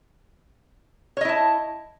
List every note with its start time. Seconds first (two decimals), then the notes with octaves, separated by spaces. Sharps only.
1.17 C#5
1.21 D#5
1.25 E4
1.29 A5